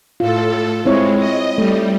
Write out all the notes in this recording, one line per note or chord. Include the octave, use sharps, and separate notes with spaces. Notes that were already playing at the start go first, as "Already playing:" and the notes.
A2 F4 A4
G#3 C4 E4 C#5
D#5
G3 A3